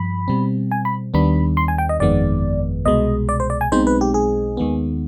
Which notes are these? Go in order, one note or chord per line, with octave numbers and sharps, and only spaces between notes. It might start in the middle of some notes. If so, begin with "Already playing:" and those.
Already playing: G2 F3 B5
B2 G3 C4
G#5
B5
D#2 D#3 G3 B3 D4 B5
C6
G#5
G5
D#5
G1 F2 D#3 G#3 B3 D5
C2 B2 G#3 D#5
D5
C5
D5
G#5
B1 B2 G#3 C4 D#4 C5
B4
G4
G#4
D#2 D#3 G#3 B3